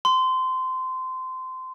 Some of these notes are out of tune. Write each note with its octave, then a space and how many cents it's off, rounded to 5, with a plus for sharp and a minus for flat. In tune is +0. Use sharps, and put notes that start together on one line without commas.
C6 -20